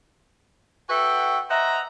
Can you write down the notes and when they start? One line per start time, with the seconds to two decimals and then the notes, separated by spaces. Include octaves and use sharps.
0.89 F#4 A4 B4 E5 F#5 G5
1.49 C5 D#5 E5 F#5 A#5